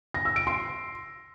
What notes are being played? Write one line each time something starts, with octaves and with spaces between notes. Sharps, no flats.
A#6
E6
D7
C6